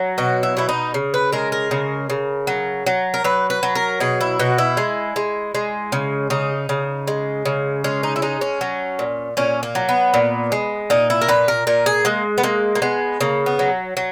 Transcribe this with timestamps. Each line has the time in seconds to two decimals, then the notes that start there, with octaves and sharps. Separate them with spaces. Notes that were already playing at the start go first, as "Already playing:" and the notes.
Already playing: F#3
0.18 B2 F#4
0.43 E4
0.57 B2 E4
0.69 D#4
0.94 C#3
1.14 B4
1.32 G#3 A#4
1.52 A#4
1.71 C#3
2.10 C#3
2.47 F#3
2.86 F#3
3.14 A#4
3.24 F#3 B4
3.50 B4
3.63 F#3
3.75 A#4
4.00 B2 G#4
4.21 E4
4.39 B2 F#4
4.58 E4
4.77 G#3
5.16 G#3
5.55 G#3
5.92 C#3
6.30 C#3 D#4
6.69 C#3
7.07 G#3
7.45 C#3
7.84 G#3 C#4
8.03 D#4
8.16 E4
8.22 G#3 D#4
8.41 C#4
8.61 F#3
8.99 A#2
9.37 A#2 C#4
9.63 A#3
9.75 F#3
9.89 B3
10.14 A#2
10.52 G#3
10.90 A#2 D#4
11.10 E4
11.21 A#4
11.28 A#2 B4
11.48 A#4
11.67 A#2 A#4
11.86 G#4
12.05 G#3 A#3
12.38 B3
12.43 G#3 A#3
12.75 A#3
12.82 G#3 B3
13.21 C#3 A#3
13.46 B3
13.59 F#3
13.97 F#3